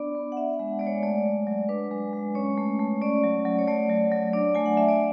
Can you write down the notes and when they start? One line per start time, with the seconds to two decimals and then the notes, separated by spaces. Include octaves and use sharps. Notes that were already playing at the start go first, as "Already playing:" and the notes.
Already playing: B3 D4 D5
0.15 B3
0.32 F#5
0.37 D4 E5
0.53 F#5
0.59 G#3
0.72 E5
0.79 G#3 D5
0.87 C#5
1.03 A3 D5
1.25 F#3
1.47 F#3
1.69 D4 B4
1.91 G#3
2.13 G#3
2.35 C#4 C#5
2.57 A3
2.79 A3
3.01 C#4 D5
3.23 F#3
3.45 F#3
3.59 C#5
3.67 A3 D5
3.89 F#3
4.12 F#3
4.33 D4 D5
4.55 A3 G#5
4.66 F#5
4.77 A3 E5
4.89 D5